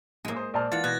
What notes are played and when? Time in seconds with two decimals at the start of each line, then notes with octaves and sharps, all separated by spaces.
0.25 A1 G#2 G#3 A#3
0.36 C5 D#6
0.54 A#1 C5 D5 A5 F6
0.72 E3 F4 F#5 A6
0.84 B2 F#6 G#6 A#6